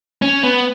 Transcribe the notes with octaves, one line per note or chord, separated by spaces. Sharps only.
C#4
B3